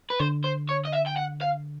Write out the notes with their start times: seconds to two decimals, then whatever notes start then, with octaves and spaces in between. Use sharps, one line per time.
0.10 B4
0.19 D3 C5
0.44 C5
0.69 C#5
0.85 D#5
0.93 E5
1.07 G5
1.17 F#5
1.41 F5